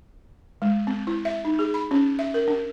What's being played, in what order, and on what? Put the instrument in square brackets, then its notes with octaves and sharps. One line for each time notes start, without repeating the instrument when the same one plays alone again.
[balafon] G#3
C4
E4
E5
D#4
G#4
B5
C#4
E5
A#4
D4